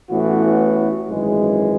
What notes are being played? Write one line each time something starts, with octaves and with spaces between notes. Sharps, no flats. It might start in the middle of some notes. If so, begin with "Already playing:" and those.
A1 A2 E3 B3 F#4
G#1 F#2 E3 G#3